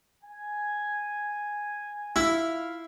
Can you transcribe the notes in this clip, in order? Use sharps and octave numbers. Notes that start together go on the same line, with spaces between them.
G#5
E4 F4 F5